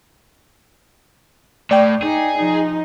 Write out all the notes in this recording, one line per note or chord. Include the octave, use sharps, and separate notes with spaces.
A2 D5 G5
D#4 G#4
F3 D#4